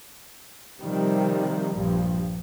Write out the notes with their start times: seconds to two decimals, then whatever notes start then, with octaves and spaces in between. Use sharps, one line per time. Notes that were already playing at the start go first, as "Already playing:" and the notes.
0.82 C3 D#3 F3 G3
1.74 A#1 G2 F3